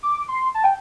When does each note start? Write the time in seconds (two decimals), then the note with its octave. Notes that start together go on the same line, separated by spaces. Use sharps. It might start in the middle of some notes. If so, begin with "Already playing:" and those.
0.03 D6
0.28 C6
0.54 A5
0.64 G5